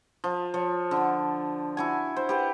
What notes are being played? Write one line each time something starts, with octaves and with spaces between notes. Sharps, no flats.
F3
F3 C#5
D3
E4 F#4 G#5
C5
G4 B4 F#5